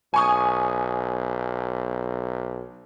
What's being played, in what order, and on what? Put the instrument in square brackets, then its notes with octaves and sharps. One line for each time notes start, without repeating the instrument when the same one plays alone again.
[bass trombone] B1 [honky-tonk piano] G#5 C#6 D#6